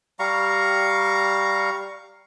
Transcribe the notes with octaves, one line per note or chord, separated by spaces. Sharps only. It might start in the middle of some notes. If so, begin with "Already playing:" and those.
G3 F5 A#5 C#6